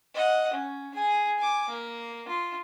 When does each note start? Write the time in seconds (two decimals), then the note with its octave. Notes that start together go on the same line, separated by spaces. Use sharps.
0.15 D#5 F#5
0.53 C#4
0.94 G#4 G#5
1.38 G#5 D6
1.69 A#3
2.28 F4